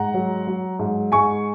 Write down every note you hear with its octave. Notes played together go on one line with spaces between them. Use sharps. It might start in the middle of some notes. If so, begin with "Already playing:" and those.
Already playing: G#2 F#5 A#5
F#3
F#3
G#2
G#2 G#5 C#6